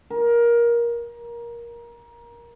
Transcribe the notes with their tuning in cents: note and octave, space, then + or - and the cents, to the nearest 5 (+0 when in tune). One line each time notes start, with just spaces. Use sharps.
A#4 +20